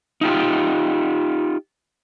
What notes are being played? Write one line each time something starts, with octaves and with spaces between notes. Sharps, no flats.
D#4 F4 G4